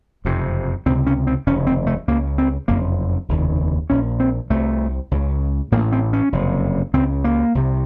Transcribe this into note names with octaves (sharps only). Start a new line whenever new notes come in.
F#1 F2 C3
C#2 C3 C4
C#4
C4
F1 D#2 C#3 C#4
C4
A3
C#2 C#3 A#3
C4
F#1 F2 C3 A#3
F1 D#2 C#3
A#1 A#2 C#4
C4
C2 C3 A3
C#2 C#3
A1 A2 A#3
C4
C#4
F#1 F2 C3
C#2 C#3 C4
A#3
C2 C3